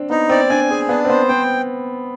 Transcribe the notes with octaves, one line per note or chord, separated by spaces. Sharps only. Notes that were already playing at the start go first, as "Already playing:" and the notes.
Already playing: C4 D4
B3 D#4
C4 D5
D4 G#5
C4 G#4
B3 D4
C4
B3 C5
C4 G5